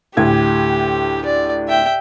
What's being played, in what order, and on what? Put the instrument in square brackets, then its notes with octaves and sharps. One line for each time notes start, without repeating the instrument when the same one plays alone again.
[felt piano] D2 A2 G#6 [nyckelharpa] G4
[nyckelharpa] D5
E5 G5